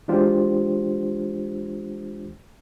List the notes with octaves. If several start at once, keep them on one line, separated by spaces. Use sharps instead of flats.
E3 G#3 D4 F4 G4 C5